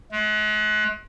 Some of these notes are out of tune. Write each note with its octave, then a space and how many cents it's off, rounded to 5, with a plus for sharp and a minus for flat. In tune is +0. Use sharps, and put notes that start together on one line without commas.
G#3 +40